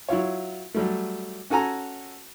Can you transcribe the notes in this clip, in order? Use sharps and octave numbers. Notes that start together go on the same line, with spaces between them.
F#3 E4 F4 C#5
F#3 G3 A3
C#4 F#4 A4 G#5 A#5